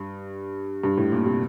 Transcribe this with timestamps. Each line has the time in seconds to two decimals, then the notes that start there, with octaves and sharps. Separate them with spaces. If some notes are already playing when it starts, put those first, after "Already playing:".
Already playing: G2
0.84 G2
0.97 A2
1.12 A#2
1.26 C3